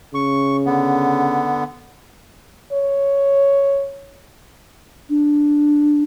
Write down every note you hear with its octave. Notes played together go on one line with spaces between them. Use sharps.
C#3 C#6
D3 B3
C#5
D4